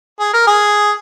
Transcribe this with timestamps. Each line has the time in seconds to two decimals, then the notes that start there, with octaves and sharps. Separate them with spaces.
0.20 G#4
0.34 A#4
0.47 G#4